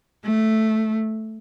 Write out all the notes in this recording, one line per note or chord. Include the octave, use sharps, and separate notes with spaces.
A3